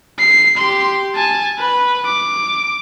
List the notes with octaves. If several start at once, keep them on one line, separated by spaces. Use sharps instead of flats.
C7
G4 C6
G#5 A5
B4
D6